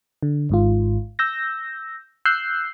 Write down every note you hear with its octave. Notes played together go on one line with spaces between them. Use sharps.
D3
G#1 G#2 F4
E6 G6 A#6
E6 F#6 G6 C7